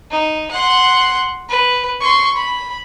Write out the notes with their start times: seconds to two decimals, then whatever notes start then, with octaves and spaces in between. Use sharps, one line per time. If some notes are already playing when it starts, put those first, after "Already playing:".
0.11 D#4
0.51 F#5 C6
1.49 B4
2.00 C6 C#6
2.36 B5